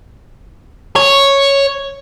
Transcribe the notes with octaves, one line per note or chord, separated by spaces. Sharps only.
C#5